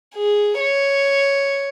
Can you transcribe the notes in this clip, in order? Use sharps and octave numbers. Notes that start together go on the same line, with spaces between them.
G#4
C#5